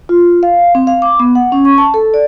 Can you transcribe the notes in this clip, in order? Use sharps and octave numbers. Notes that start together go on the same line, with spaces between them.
F4
F5
C4
F5
D6
B3
F#5
C#4
C#6
A5
A4
D5